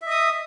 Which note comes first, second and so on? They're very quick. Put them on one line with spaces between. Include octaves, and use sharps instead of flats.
E5 D#5 D#6